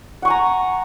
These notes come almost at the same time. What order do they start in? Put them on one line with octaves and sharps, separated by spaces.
F#5 C#6 G#5 A#5